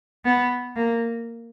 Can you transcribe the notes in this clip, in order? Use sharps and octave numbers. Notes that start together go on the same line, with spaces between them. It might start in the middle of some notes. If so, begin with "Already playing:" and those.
B3
A#3